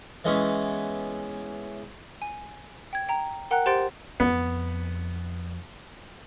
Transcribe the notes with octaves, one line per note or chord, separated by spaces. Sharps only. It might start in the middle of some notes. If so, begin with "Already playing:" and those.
E3 G#3 B3 C#4
G#5
G5 G#6
G5 A#5
A#4 F#5 G5 A#5 F#6
G4 C5 F#5 C6 A6 D7
F2 B3